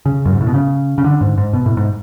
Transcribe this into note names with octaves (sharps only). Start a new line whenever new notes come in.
C#3
F#2
G#2
A2
B2
C#3
C#3
D3
G#2
G#2
B2
A2
G#2